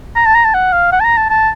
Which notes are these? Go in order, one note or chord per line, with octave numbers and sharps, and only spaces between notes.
A#5
A5
A#5
A5
F#5
F5
F#5
A5
A#5
A5
A5